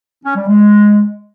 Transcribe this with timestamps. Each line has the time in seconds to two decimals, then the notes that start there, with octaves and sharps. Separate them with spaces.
0.25 C#4
0.36 G3
0.47 G#3